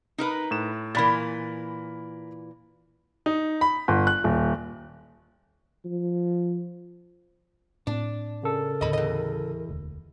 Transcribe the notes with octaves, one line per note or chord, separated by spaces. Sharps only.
D#4 A#4 B4
A2 E7
A#2 E3 A#4 B5 A6
D#4
B5
G1
F#6
D#1
F3
A2 C4 D4
C#3 A4 A#4
D#2 A2 D3 D#5 B5
E2 D#5
E1 D2